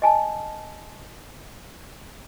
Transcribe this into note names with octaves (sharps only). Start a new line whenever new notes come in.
D#5 G#5 A5